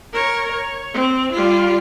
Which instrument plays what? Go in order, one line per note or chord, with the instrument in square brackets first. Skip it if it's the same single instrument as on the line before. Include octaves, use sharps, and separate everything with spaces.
[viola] A#4 C#5
C#5
C4
G3 F4